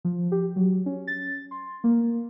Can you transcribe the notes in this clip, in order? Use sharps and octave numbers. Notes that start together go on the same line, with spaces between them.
F3
G4
F#3
C#4
A6
C6
A#3